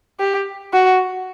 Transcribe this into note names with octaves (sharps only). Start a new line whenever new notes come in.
G4
F#4